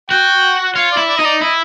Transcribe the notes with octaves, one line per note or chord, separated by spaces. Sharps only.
F#4 G5
F4 C#5
D5
E4
D5
D#4 D#5
D5
E4 D#5